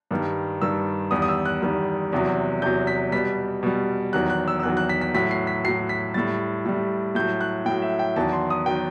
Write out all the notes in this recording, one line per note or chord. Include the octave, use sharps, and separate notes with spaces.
G2 D#3 G3
G2 D#3 G3 E6
E2 D#3 G3 D#6
D#6
E6
F#6
E2 D#3 G3
E2 C3 F#3
E2 C3 F#3 G6
B6
B2 G3 B6
B2 G3
E2 D#3 F#3 F#6
F#6
E6
E6
E2 D#3 F#3 F#6
F#6
B6
B6
A2 F#3 B6
C7
B6
A2 F#3 C7
B6
A2 G3 A6
A2 G3
A2 F#3 G6
F#6
A2 F#3 G5
E5
G5
E2 D#3 F#3 A5
C6
D#6
D#3 F#3 G5